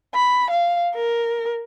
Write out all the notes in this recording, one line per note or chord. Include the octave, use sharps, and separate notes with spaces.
B5
F5
A#4